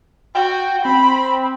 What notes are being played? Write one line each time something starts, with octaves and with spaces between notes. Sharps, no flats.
F#4 G5
C4 B5